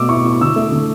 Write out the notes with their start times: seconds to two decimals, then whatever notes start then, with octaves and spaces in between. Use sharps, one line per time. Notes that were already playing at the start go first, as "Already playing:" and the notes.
Already playing: B2 A3 D6 E6
0.09 E4 C#6
0.25 E4
0.41 D3 E6
0.56 A3
0.72 D3